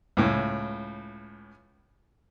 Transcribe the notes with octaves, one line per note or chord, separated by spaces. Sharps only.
C#2 A2